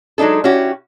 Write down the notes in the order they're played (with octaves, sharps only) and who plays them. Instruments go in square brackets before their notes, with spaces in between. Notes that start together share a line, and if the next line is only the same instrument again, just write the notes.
[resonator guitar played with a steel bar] F#3 G#3 D4 D#4 A4
C#4 E4 F#4 G4